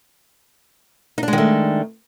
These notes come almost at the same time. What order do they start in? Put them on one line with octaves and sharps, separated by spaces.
D#4 D4 G#3 D#3 A3